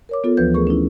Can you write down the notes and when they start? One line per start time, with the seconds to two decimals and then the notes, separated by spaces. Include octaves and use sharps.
0.09 A#4 C#5 D6
0.24 B3 F4 A4
0.37 D2 E3 F3 B4 G6
0.54 A3 G#4 A#4 C#6
0.67 C#4 D4 E4